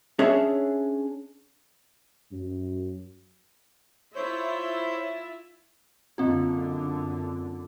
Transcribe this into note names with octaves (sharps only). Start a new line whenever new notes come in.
C#4 D4 G#4 C#5 E5
F#2
E4 F4 C5 C#5 E5 G6
F#2 D3 A#3 C4 F4